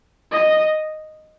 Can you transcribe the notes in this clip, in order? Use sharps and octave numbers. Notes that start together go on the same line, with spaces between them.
D#5